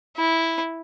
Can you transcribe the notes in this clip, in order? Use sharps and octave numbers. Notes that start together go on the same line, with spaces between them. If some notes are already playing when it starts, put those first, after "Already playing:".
E4